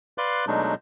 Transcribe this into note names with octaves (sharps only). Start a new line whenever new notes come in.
B4 D5 F5 C6 D6 F#6
B2 F#3 G#3 A3 D4 D#4